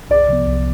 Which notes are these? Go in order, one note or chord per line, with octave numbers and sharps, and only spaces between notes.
C2 D5
C3 F3 B3
C2